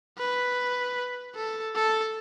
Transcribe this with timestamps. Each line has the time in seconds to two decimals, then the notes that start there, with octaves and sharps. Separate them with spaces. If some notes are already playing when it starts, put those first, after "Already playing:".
0.18 B4
1.35 A4
1.75 A4